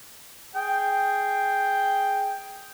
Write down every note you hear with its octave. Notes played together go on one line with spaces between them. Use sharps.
G#4 G5